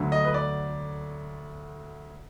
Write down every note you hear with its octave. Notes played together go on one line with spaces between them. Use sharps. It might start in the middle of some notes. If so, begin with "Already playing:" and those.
Already playing: D2 D3 F#3
D#5
B4
D5